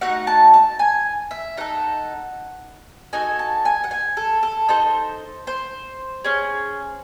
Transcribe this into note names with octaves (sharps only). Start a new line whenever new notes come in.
A3 D#4 F#4 F#5
A5
A5
G#5
E5
D#4 A4 F#5
D#4 F#4 A4 G#5
A5
G#5
F#5
G#5
A4
A4
D#4 A4 C5
C5
C#4 G#4